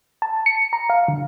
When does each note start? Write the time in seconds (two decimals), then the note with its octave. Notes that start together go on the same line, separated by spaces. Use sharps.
0.22 A5
0.46 C#7
0.73 A#5
0.90 F5
1.08 D3